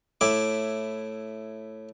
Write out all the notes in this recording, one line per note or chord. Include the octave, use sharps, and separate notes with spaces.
A2 E4 D6